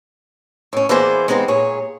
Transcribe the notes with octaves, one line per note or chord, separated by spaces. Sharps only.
A2 C#4
E3 A#3 B3 G#4 C5 D5
G#3 B3 C4 D4 D#4
A#2 G#4 C#5